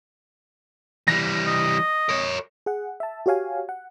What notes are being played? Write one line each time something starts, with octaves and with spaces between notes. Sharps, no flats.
E3 G3 A#6
D#5
A#4 C#5
G#4 F#5
E5 A5
F#4 G4 C#5 F5 G#5
F#5